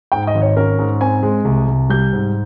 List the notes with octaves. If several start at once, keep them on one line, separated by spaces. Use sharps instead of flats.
G#2 G5
D#5
G#1
C#5
C#4 A#4
G#2
C4 G#5
G#3
C2
C2
G3 G6
G#2